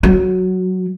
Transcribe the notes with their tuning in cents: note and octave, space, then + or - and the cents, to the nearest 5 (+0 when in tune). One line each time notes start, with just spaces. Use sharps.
F#3 +0